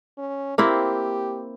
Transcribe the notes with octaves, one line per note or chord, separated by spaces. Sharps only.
C#4
A#3 C4 E4 G4